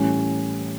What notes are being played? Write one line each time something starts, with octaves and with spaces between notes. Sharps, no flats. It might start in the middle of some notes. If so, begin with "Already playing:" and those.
Already playing: A2 E3 G3 C#4